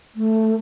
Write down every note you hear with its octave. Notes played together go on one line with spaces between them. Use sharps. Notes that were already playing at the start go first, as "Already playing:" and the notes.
A3